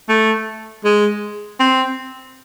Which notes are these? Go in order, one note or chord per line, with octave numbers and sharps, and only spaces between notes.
A3
G#3
C4